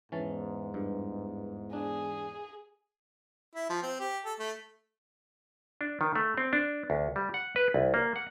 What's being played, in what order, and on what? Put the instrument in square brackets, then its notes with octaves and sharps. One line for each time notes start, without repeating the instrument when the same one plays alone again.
[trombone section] E2 G#2 [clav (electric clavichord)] E3 C#4 A5
[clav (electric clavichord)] G2
[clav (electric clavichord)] D4 [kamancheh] G#4
[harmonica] E4
F3
C4
G4
A4
A3
[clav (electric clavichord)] D4
D#3
A3
C4
D4
D2
G3
F#5
B4
C2
A#3
F#5